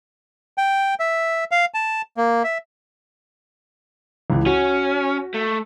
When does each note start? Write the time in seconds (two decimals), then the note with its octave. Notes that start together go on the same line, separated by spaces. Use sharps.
0.58 G5
1.00 E5
1.51 F5
1.74 A5
2.17 A#3
2.44 E5
4.30 C#2 E3
4.46 C#4 F#4
5.34 A3